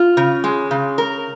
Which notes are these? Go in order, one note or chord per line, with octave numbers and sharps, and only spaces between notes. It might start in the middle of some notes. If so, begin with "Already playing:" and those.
Already playing: F4
C#3
G#3
C#3
A#4